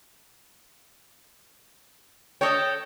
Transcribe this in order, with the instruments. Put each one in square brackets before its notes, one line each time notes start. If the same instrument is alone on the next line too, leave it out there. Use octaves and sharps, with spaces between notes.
[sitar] A4 C#5 [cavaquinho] D#5 G5